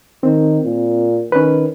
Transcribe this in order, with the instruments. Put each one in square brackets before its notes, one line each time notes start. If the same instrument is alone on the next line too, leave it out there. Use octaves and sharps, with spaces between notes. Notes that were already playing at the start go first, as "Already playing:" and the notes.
[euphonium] D#3 [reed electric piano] C4
[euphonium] A#2
[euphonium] D#3 [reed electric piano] C#4 B4